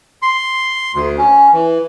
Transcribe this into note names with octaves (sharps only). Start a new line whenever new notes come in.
C6
D2
C#4
E3